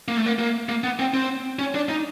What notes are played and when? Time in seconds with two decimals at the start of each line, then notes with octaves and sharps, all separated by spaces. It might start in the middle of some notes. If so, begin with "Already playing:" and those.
0.08 A#3
0.17 A3
0.26 A#3
0.39 A#3
0.69 A#3
0.84 B3
0.99 C4
1.14 C4
1.59 C#4
1.75 D4
1.89 D#4